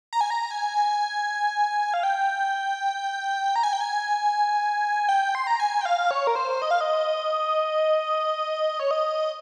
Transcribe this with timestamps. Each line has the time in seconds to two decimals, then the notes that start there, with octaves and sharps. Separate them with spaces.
0.13 A#5
0.21 G#5
0.30 A#5
0.51 G#5
1.94 F5
2.03 G5
3.56 A#5
3.63 G#5
3.73 G5
3.81 G#5
5.09 G5
5.35 C6
5.47 A#5
5.60 G#5
5.81 G5
5.85 F5
6.11 C#5
6.27 A#4
6.35 C5
6.62 D#5
6.71 F5
6.81 D#5
8.80 C#5
8.91 D#5